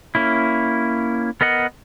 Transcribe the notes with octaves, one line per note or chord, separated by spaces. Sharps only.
A#3 C#4 E4
B3 A#4 D#5 F#5